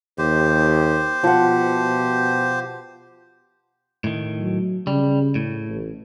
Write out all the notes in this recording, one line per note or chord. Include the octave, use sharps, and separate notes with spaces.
D#2 G4 C5
B2 F3 F#5
A2 D#3
F#3
C#3 G3
A2
A1